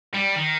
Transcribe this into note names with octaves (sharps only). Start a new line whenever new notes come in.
G3
D#3